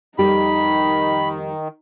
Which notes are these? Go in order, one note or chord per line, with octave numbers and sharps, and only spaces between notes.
F2 D#3 G3 D#4 G4 B5